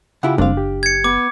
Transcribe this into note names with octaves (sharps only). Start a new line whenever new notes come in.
C#3 E4 F4 G4 E5 F#5
F#1 G3 C4 D4 F5
G4
G#6 C#7
B3 D6